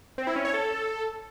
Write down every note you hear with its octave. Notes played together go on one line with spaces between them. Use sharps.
C4
E4
C#4
C#5
A4